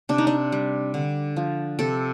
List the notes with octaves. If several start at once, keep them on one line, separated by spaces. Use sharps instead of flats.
C3 D4
D#4
D4
G3
D3
F3
C3 A4